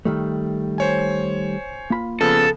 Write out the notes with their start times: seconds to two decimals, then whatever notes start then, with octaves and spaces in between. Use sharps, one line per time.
0.05 D#3 G3 A3
0.78 C5 C#5 G#5
1.90 A#3 F4 B5
2.21 C#3 F3 B3 A4